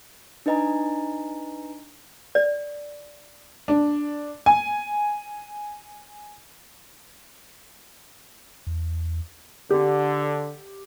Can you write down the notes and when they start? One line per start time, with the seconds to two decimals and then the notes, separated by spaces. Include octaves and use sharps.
0.46 D4 D#4 B4 D#5 G#5 A#5
2.35 D5
3.68 D4
4.46 G#5
8.67 E2
9.70 D3 G4